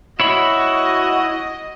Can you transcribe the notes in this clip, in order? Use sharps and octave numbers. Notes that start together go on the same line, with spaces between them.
E4 F#4 C#5 D#5 B5